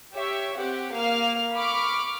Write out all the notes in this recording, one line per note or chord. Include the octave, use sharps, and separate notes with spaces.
G4 C#5 E5
C4 G4 F#5
A#3 F5 F6
B5 C#6 D6 F6